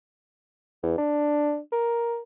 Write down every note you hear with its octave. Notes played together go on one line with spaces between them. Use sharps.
E2
D4
A#4